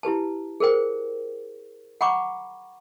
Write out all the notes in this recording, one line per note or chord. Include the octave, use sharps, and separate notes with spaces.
E4 G4 B4 A5
G#4 A#4 C5 G5
F#5 G5 A#5 B5 C#6 D6